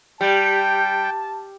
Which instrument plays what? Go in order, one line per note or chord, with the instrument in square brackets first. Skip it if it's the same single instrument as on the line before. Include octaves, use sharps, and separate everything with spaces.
[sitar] G3 [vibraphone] G4 [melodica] G5 [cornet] A5